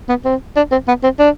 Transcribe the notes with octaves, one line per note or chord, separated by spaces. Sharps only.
B3
C4
D4
C4
B3
C4
D4